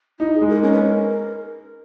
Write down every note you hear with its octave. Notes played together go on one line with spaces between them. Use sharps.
D#4 E4
G#4
G#3
A#4
C#4 A#4
B4
A#4